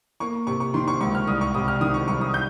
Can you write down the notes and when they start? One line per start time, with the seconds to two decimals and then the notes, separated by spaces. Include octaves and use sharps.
0.20 A#3 C#6
0.47 C3 C#6
0.60 C#6
0.74 D#3 C6
0.88 C#6
1.01 C#2 C#6
1.15 F6
1.27 C2 D#6
1.41 C#6
1.54 C3 D#6
1.68 F6
1.81 D#3 D#6
1.94 C#6
2.08 C2 C#6
2.21 D#6
2.34 G6